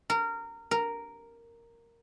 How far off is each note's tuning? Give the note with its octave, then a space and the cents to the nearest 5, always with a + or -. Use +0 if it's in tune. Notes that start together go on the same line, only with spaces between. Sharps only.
A#4 -20
A#4 -5